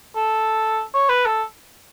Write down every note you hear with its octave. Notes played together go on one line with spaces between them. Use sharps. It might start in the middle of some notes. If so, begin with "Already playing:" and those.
A4
C#5
B4
A4